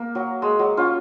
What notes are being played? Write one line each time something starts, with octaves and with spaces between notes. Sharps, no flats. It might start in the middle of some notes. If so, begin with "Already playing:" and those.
Already playing: A#3
F#3
G#3
F#3
C#4 F4